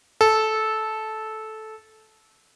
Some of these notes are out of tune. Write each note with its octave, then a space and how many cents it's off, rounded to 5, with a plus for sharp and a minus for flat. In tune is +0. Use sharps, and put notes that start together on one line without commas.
A4 -10